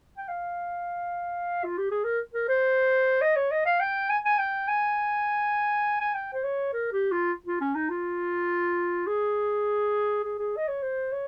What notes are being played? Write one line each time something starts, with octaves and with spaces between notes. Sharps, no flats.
G5
F5
F4
G4
G#4
A#4
A#4
C5
D#5
C#5
D#5
F5
G5
G#5
G#5
G5
G#5
G#5
G5
C5
C#5
A#4
G4
F4
F4
C#4
D#4
F4
G#4
G#4
G#4
D#5
C#5
C5
C#5